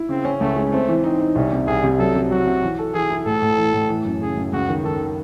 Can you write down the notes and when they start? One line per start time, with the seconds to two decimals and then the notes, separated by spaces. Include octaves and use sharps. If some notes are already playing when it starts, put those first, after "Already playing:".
Already playing: E4
0.09 C#3 C4
0.25 C#4
0.40 C#2 A3
0.56 G#3
0.72 A3 C4
0.88 E3
1.04 C4 D#4
1.20 D#4
1.35 C2 C#4
1.52 C3
1.67 C2 G#4
1.84 C3
1.99 F#3 A4
2.15 C3
2.31 F#3 F#4
2.46 C3
2.63 E3
2.78 A4
2.94 E3 G#4
3.10 E4
3.25 A2 A4
3.42 A2
3.58 E3
3.74 A2
3.89 E3
4.05 F#2
4.21 C#3 G#4
4.37 F#2
4.53 C#2 F#4
4.68 D#3
4.84 D#3 A4